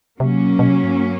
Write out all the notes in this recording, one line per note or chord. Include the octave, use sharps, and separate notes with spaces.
C3 F#3 A#3 C#4
B2
B2
C3
G#2
G2